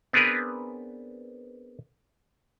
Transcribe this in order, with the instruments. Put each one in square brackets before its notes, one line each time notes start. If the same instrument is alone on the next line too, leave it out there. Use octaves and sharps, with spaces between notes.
[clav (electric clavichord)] B3 C4 D4 G#4 A#4 B4